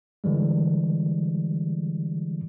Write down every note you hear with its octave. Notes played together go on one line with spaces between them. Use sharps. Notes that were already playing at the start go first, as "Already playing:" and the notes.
D3 E3 G3 G#3